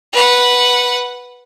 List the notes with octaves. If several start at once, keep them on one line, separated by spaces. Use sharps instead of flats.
B4 F#5